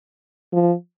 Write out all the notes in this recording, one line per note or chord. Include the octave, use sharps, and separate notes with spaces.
F3